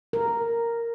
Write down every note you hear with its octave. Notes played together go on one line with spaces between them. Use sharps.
A#4